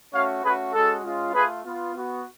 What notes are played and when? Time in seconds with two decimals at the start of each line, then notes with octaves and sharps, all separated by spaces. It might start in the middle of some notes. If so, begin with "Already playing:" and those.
0.13 A3 C#4 F#4 C#5 F5
0.43 A3 C#4 F#4 G#4 B4
0.73 G#3 C#4 F#4 A4
1.03 G#3 C#4 F4
1.33 A3 F4 G#4 B4
1.64 B3 F4
1.94 B3 F#4